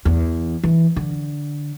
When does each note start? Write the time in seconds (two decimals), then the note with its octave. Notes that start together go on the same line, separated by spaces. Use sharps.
0.05 E2
0.64 E3
0.96 D3